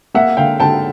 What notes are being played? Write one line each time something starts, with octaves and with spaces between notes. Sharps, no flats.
A#3 E5 F#5
D3 F5 G5
D3 G5 A5